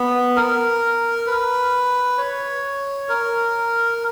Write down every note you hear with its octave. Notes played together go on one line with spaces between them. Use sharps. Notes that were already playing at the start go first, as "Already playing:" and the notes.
Already playing: B3
A#4
B4
C#5
A#4